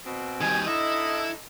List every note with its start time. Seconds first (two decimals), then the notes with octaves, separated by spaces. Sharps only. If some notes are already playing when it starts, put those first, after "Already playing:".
0.06 B2 C4
0.41 D#3 G3 G#5
0.67 D3 D#4 E4 A4 D#5